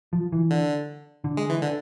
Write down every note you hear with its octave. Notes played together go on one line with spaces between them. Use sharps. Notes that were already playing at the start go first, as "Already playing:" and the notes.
F3
E3
D3
D3
G#3
E3
D3